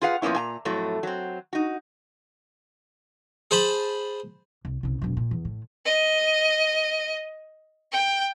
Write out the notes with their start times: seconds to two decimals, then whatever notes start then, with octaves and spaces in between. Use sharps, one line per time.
0.01 F4 G#4 B4 F5 F#5
0.22 A#2 F3 A#3 B3 C#4 E4
0.35 A#2 G#5 A#5
0.65 F2 A2 F#3 A3
1.03 F#3 C4
1.53 D#4 F#4
3.51 G#4 C5 A5 B5
4.65 C2
4.83 C2 C#3
5.02 E1 F#2
5.17 A#2
5.31 E2
5.45 A2
5.85 D#5
7.92 G5